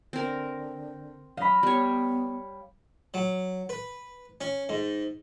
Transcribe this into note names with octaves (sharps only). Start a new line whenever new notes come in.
D3 C4 A#4
F#3 D#5 F5 B5
G3 B3 C#5
F#3
B4
C#4
G#2